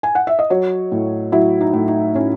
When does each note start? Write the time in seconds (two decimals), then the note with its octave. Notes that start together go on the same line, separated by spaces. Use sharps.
0.03 G#5
0.15 F#5
0.27 E5
0.39 D#5
0.50 F#3 C#5
0.92 A2
1.32 F#3 E4
1.61 D#4
1.73 A2
1.88 D#4
2.14 A2 C#4